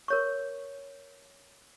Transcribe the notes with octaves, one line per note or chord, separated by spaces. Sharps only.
A#4 C#5 C#6